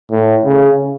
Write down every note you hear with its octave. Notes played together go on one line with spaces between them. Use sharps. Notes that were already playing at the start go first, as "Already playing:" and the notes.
A2
C#3